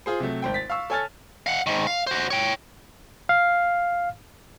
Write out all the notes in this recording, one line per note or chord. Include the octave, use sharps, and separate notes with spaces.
F4 G#4 C5
C3 F#3 A3
G#1 C5 G5
A6 B6
F5 C#6 E6
A4 C#5 G#5 A5 F6 A6
F5 F#5
G#2 D#3
F5
F#4 C5
C#5 G5
F5